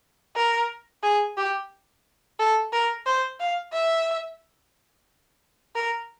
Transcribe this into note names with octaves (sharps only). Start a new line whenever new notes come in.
A#4
G#4
G4
A4
A#4
C5
F5
E5
A#4